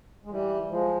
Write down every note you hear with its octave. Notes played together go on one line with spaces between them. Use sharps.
G#3
E3 G3
F3 G#3